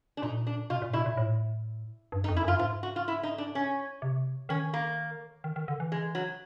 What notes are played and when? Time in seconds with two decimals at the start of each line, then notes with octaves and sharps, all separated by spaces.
0.17 D4
0.22 A#2 D#4
0.47 D4
0.70 B2 F4
0.82 A#2
0.93 B2 E4
1.06 A#2
1.17 A2
2.12 G2
2.24 D#4
2.28 F2
2.36 E4
2.44 F#2 F4
2.59 G#2 F4
2.83 F#4
2.96 F4
3.08 E4
3.23 D#4
3.38 D4
3.55 C#4
4.02 C3
4.49 D#3 C#4
4.74 A#3
5.44 D#3
5.56 D#3
5.68 D3
5.80 E3
5.92 G#3
6.15 F#3